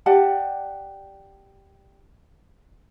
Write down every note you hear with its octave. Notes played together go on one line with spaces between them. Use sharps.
G4 D5 F#5 A5